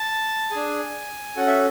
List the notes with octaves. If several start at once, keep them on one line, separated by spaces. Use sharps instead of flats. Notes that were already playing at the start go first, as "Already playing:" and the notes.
Already playing: A5
D4 G#4 G#5
C#4 F#4 A4 F#5
E5